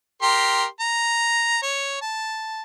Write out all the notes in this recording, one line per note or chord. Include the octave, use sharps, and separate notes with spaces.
G4 A#4 C6
A#5
C#5
A5